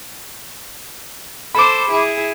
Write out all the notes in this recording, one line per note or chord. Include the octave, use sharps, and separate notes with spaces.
A4 C5 B5 D6
E4 G#4